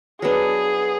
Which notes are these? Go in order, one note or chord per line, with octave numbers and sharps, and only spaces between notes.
F#3 B3 D4 G#4